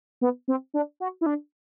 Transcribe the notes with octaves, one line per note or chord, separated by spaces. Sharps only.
B3
C4
D4
F#4
E4
D4